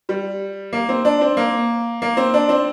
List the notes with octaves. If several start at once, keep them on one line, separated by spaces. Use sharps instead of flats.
G3
A#3
C4
D4
C4
A#3
A#3
C4
D4
C4